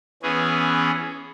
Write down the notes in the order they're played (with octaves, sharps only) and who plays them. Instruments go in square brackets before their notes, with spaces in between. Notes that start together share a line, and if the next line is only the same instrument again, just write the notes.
[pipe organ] E3 B3 C#4 G#4